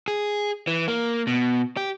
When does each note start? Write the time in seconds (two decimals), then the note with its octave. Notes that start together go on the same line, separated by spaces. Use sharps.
0.08 G#4
0.67 E3
0.88 A#3
1.27 B2
1.77 G4